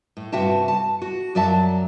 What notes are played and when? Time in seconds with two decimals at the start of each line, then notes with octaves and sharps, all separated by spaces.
0.17 A2
0.32 G2 C3 F#4 E5 G5 A5
0.68 A5
1.02 F#4
1.35 F#2 F#3 D5 E5 A5